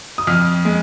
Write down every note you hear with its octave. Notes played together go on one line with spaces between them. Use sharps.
D#6
F2 F6
G#3